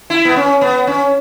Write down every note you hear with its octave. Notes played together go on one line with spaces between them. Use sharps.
E4
B3
C#4
B3
C#4